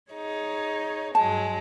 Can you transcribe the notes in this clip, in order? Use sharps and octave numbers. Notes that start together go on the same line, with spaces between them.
D#4 G#4 C#5
G2 F#3 G#3 A5